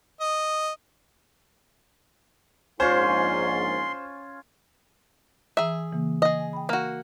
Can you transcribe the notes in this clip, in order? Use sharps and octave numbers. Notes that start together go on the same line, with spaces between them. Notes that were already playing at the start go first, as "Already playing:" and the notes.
D#5
A#1 G#2 C#4 F4 C5 C6
E3 G#4 E5 A#5 E6
C#3 E3 A#3
G#4 D#5
G#5
G5 B5
A#3 F#4